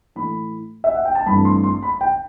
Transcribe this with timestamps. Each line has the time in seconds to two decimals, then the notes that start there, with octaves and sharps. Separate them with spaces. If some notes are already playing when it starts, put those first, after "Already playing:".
0.15 A2 E3 A3 B5
0.84 E5
0.94 F#5
1.05 G5
1.15 A5
1.26 G2 E3 A3 C4 B5
1.45 C6
1.64 C6
1.83 B5
2.01 G5